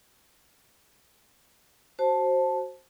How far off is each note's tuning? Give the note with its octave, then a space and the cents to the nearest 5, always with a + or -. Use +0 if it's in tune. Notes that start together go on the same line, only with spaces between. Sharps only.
F#4 +15 C5 +15 A5 +0